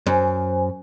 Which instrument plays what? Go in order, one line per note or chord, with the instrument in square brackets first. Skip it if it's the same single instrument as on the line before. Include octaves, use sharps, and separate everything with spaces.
[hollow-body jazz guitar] F#2 [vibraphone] C5 G#5